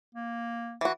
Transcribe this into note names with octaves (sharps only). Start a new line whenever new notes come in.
A#3
E3 F#4